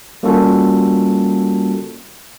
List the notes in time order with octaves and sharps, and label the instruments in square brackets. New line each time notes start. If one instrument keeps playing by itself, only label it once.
[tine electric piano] G3 A#3 C#4 F4 F#4 A4